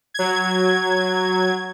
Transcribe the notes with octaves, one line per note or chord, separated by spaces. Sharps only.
F#3 G#6